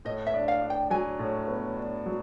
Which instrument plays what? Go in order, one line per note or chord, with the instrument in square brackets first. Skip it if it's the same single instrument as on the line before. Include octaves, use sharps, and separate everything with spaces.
[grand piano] A2 [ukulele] D#5
[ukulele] E5
[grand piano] D4
[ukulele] F5
[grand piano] D4
[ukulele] G5
[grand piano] F#3 [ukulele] G#5
[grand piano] A2
B3
D4
F#3